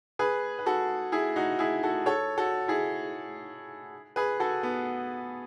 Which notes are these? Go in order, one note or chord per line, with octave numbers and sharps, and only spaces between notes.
G#4 B4
B4
F#4 A4
E4 G#4
D#4 F#4
E4 G#4
F#4 A4
A4 C#5
F#4 A4
E4 G#4
G#4 B4
F#4 A4
B3